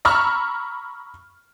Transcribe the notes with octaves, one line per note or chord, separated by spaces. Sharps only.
A#5 B5 C#6 E6 F6